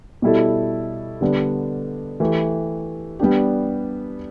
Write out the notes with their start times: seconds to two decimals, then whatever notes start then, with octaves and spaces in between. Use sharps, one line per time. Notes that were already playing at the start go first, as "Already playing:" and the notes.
0.22 B2 G3 E4 A4
1.21 D3 G3 B3 D4
2.20 E3 A3 G4
3.20 G3 B3 D4 G4